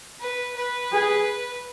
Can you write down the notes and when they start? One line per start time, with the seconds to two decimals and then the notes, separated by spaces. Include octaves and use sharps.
0.20 B4
0.56 B4
0.92 G#4